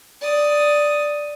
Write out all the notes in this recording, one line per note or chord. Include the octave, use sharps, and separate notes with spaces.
D5 D#6